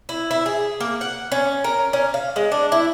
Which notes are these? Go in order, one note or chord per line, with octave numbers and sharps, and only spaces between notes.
E4
E4
G#4
A#3
F#5
C#4
A#4
C#4
F5
G#3
D4
E4